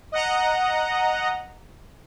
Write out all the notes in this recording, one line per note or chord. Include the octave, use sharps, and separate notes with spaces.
D#5 F#5 A#5